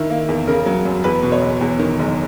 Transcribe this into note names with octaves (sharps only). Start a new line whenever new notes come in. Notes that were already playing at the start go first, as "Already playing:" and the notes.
Already playing: D#3 E4
A#3
E2
C#3 A#4
F#3
F#2
E2 B4
B2
C#5
F#1
E2
D#3
F#1